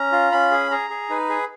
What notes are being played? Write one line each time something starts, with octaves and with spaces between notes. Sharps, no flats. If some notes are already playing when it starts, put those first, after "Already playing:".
Already playing: C#4 A#5
F4
C#4 B5
G#4
G#4 A#5
G#4
D#4 B4
G#4